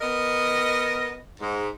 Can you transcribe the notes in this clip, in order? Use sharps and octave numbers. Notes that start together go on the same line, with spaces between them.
B3 A#4 D#5
G#2